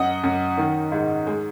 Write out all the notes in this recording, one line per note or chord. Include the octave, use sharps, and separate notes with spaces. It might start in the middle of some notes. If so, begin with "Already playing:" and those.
Already playing: F#2 D#5 F#5
F#2
D#3
G#2
G#3